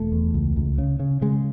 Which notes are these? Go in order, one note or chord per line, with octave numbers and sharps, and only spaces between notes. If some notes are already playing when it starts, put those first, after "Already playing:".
Already playing: E1 A3
E2
C#2
C#2
C#3
C#3
C#3 G#3